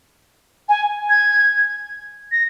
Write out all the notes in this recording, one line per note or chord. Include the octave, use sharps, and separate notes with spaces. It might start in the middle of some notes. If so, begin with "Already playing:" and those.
G#5
G#6
A#6